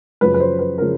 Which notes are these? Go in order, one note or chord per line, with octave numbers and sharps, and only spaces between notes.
F#2 C#3 F3 B4
B4
C5
B4
C#3 F3 A#4